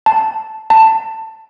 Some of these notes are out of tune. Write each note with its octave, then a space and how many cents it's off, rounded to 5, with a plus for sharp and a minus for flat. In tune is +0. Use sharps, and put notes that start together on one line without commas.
A5 -5
A5 +15